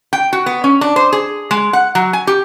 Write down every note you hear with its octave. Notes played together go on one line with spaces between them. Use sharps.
G5
F#4
B3
C#4
D4
C5
G#4
G#3
F#5
F#3
G#5
G4